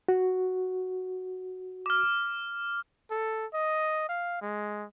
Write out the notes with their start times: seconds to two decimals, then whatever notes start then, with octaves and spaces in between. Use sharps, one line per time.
0.09 F#4
1.86 D6 F6
3.11 A4
3.53 D#5
4.09 F5
4.42 G#3